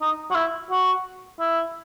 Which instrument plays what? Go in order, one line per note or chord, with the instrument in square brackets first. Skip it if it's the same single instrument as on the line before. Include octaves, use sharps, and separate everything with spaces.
[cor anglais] D#4
F#4
E4
F#4
E4